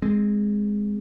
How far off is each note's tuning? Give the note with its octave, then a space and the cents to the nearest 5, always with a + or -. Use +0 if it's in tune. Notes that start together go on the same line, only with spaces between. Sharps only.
G#3 -5 C4 +0